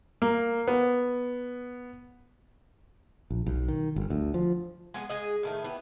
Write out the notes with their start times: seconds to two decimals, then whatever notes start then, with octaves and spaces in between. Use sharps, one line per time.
0.22 A#3
0.68 B3
3.30 A#1
3.47 B1
3.68 D#3
3.96 G1
4.10 D2
4.34 F3
4.94 G#3 B3 G4 G#4
5.09 G#3 G#4 D#5
5.43 A2 D#3 A3
5.64 B3 E4 G4